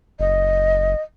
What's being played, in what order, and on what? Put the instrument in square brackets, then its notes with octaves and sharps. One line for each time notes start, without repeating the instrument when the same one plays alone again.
[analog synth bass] F#1 [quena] D#5